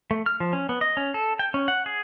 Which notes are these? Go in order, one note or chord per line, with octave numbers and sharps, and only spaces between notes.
A3
F6
F3
C#4
B3
D#5
C#4
A4
G5
C#4
F#5
G#4